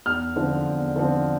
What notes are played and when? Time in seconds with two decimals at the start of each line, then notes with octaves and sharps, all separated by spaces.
0.06 E2 F6
0.36 D3 F3 C4
0.66 E2
0.95 D3 F3 C4